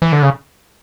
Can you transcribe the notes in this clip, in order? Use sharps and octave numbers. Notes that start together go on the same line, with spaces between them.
E3
D3
C#3